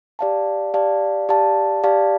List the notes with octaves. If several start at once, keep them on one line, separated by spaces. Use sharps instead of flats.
G4 D5 F5 A5
G4 D5 F5 A5
G4 D5 F5 A5
G4 D5 F5 A5